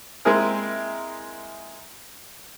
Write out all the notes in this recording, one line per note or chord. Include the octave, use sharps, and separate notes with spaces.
G#3 A#3 C4 E4 G#4 A#4